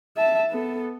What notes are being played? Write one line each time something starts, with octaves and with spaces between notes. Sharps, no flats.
E5 A5
B3 A4